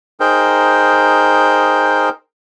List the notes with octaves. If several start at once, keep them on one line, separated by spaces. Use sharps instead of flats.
D#4 G#4 A#4 C5 G5